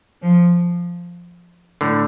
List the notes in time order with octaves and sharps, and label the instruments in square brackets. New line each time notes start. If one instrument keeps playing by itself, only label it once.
[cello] F3
[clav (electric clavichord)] A2 D3